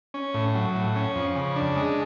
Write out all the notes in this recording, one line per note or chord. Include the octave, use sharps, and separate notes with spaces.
C#4
A2
F#3
A2
C#4
F2
C#3
D4
G#3